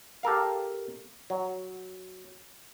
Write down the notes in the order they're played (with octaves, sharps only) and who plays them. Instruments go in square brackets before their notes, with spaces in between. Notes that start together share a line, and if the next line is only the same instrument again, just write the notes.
[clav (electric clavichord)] G4 A4 A#4 F5
F#3